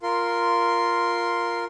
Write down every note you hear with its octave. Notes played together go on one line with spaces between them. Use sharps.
F4 A#4 C6